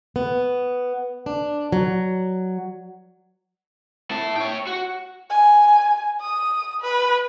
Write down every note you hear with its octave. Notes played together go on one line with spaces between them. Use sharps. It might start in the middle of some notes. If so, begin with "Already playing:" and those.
B3
D4
F#3
E4 A5
C#5 G5
F#4
G#5
D#6
B4